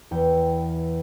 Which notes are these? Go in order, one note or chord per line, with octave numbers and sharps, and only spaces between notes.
E2 G5